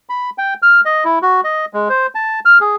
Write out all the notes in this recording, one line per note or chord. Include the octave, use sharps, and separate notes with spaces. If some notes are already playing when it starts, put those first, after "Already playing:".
B5
G5
F6
D#5
E4
F#4
D#5
G#3
C5
A5
F6
G#4